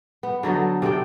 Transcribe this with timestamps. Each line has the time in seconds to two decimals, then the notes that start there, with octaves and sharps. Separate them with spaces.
0.23 B3
0.43 D3 F#3 D#4 A4
0.82 C3 C4 A4 G5